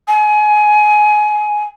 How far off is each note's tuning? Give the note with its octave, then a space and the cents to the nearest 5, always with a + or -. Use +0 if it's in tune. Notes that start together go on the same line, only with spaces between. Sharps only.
G#5 +20